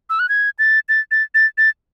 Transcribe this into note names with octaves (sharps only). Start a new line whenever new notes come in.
E6
F#6
G#6
A6
A6
A6
A6
A6